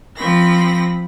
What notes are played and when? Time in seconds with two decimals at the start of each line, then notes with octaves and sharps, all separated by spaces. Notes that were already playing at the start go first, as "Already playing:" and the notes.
0.16 F3 C4 B5 A#6